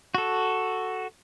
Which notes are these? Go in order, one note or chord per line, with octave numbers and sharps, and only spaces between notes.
F#4 A4